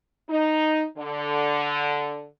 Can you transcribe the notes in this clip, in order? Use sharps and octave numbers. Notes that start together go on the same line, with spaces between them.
D#4
D3